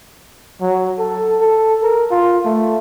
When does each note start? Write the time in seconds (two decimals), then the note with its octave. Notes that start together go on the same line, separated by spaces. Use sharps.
0.61 F#3
0.99 A4
1.42 A4
1.83 A#4
2.11 F4
2.45 A3